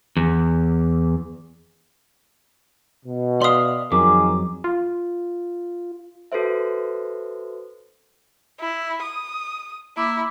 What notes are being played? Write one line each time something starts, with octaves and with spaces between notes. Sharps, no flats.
E2
B2
D5 E5 F5 C6 D#6
F2 D#3 F#3 G#4 A#4 D6
F4
F#4 A4 B4 C5 E5
E4
D#6
A#3 E4 D6 E6